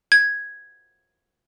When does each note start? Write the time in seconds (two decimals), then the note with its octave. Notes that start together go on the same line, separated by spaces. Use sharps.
0.12 G#6